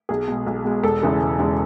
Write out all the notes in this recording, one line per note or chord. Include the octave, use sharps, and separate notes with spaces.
B1 G#4
B2 G#3
B1
B2 G#3
E1 A4
E2 C#3 E3 G#3
E1
E2 C#3 E3 G#3